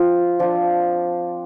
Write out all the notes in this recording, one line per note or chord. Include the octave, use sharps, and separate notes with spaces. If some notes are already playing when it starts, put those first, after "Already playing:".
Already playing: F3 C4 F4
F3 D4 F4